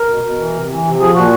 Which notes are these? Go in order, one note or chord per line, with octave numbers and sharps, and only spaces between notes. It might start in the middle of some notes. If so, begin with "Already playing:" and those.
Already playing: A#4
B2
B2
E3
C3
E3
C3
F3 G#4
A#2 F#4